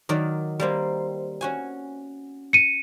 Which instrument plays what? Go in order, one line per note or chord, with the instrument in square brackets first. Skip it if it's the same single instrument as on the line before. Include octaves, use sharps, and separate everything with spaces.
[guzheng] D#3 F#3 D5
G3 A#3 C4
C#4 F#4 G#5
[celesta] C#7 D#7